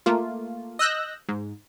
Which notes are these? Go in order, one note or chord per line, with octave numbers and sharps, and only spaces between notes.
A3 A#3 F4
D#5 E6 F#6 G6 A#6
G#2